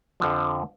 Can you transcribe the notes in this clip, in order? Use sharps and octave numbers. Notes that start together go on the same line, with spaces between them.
F2 D3 F3